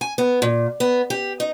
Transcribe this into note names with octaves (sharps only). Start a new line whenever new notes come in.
G#5
B3
A#2
B3
G4
D#4